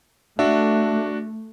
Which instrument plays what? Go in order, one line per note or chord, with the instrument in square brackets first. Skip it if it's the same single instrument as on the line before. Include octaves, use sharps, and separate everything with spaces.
[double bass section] A3 [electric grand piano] D4 F#4 [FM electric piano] E5